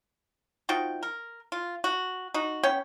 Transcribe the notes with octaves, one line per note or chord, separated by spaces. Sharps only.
F3 D#4 F#4 G5
A#4
F4
F#4
D#4 F#4
B3 C#4 C#5 G5